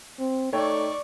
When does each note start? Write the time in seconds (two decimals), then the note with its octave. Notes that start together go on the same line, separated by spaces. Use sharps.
0.20 C4
0.53 A3 D#4 C#5 D5 G5 C#6